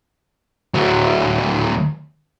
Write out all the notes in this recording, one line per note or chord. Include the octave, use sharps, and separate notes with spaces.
D2 F#3